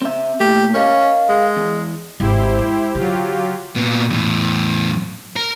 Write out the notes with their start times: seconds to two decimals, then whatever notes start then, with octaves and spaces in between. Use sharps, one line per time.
0.02 C4 E5
0.40 A#2 A3 G4
0.74 C#4 A#4 D#5 F5
1.29 G#3
1.57 E2
2.20 G#1 E4 G4 C5
2.59 G#3
2.95 D3 F#3 F4 G4
3.76 A#2 B3
4.10 E2 A2
5.36 A#4